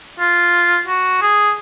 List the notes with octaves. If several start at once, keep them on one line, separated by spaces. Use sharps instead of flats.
F4
F#4
G#4